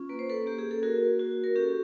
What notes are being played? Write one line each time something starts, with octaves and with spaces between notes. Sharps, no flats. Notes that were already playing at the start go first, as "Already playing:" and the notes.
Already playing: C#4 F4
A#3 B4
C5
A4 B4
A#3 G4
G#4
A4
F#4 G#4 A#4
F#4
A#4
C#4 G4 A4